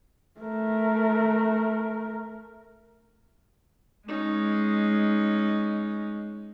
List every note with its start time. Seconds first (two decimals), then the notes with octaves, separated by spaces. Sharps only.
0.40 A3 A#4
4.08 G#3 C#4 D#4